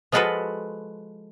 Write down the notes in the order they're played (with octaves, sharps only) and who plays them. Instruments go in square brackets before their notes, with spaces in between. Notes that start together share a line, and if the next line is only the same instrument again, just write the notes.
[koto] F3 G#3 F4 F#4 A4 B4